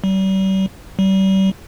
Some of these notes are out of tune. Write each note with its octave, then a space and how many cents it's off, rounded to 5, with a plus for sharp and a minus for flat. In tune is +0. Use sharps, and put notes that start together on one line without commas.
G3 -40
G3 -35